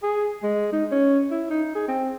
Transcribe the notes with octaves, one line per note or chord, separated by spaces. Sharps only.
G#4
G#3
D#4
C#4
E4
D#4
G#4
C4